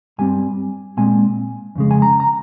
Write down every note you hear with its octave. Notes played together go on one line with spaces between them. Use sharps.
G2 G3 C4 G#5
A#2 G#3 C4 G#5
F2 C#3 G#3
G#5
A#5
A#5